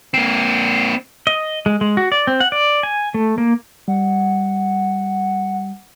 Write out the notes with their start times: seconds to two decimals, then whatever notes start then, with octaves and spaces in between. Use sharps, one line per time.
0.14 A#3 C4
1.27 D#5
1.66 G#3
1.81 G#3
1.97 F#4
2.12 D5
2.27 C4
2.40 F#5
2.52 D5
2.83 G#5
3.14 A3
3.38 A#3
3.88 G3 F#5